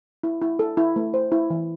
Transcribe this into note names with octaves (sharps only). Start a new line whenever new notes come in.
E4
E4
A4
E4
A3
C5
E4
E3